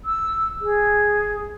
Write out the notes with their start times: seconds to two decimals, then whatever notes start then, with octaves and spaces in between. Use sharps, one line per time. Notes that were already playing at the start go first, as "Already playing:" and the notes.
0.05 E6
0.61 G#4